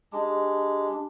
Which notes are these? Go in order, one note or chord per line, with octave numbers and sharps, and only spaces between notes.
G#3 D4 G4